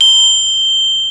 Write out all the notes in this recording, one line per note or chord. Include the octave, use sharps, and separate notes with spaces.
G7